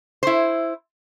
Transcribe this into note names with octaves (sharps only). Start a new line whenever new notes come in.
E4 C5